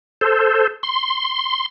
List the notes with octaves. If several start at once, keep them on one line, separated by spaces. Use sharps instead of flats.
A4 C5
C6